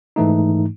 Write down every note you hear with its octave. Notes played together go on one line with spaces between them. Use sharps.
G#2 E3 A3 D#4